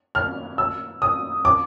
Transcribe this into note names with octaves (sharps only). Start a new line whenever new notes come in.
F6
E6
D#6
D6